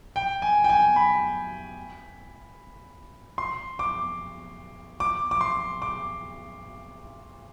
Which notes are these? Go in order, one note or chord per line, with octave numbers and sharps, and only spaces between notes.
G5
G#5
G5
G#5
B5
C6
D6
D6
D6
C6
D6